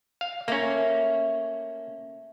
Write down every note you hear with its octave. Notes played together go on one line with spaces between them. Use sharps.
F5
A3 A#3 C#4